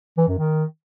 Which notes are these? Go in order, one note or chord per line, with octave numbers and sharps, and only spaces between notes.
E3
F#2
D#3